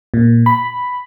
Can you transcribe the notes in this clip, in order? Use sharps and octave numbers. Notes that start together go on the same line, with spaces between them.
A#2
B5